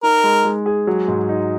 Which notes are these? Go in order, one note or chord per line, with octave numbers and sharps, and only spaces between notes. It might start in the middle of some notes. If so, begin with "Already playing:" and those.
D#4 A#4
G#3
G#3
G#4
F#3
G#2
D#4